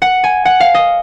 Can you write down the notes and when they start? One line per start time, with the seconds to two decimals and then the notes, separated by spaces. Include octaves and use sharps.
0.02 F#5
0.24 G#5
0.45 F#5
0.60 F5
0.75 D#5